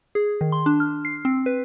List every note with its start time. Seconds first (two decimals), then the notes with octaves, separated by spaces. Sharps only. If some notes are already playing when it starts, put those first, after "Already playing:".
0.15 G#4
0.41 D#3
0.52 C6
0.66 D4
0.80 F6
1.05 C7
1.25 C4
1.46 B4